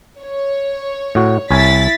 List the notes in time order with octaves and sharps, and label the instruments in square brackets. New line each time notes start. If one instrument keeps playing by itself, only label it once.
[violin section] C#5
[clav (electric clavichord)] A2 F#4
[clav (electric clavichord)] C2 C#5 G#5 [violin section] E4 A6 B6